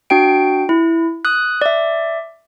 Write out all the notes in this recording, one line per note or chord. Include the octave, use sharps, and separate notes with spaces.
D4 F#4 G5 D7
E4
D#6 F#6
D5 E5